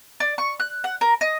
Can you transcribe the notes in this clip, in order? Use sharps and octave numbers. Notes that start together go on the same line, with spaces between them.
D5
C#6
F#6
F#5
A#4
D#5